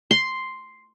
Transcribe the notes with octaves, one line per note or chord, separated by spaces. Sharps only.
C6